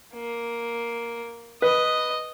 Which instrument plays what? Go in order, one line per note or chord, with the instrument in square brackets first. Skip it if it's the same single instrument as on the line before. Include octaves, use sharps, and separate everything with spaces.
[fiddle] A#3
[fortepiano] B4 [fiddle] D#5